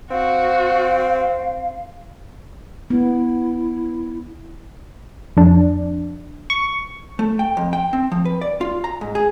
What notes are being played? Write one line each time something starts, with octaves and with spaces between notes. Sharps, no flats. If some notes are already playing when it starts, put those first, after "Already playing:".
C4 F#4 F5
B3 E4
F2 D4
C#6
A3
G5
F2
G5
C4
F3
B4
D5
F4
A#5
G#2
G#4